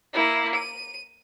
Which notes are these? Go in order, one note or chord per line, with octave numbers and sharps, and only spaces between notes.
A#3 E4
D#7